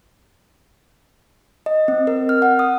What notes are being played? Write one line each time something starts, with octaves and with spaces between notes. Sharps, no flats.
D#5
C4
A#4
F6
F#5
D#6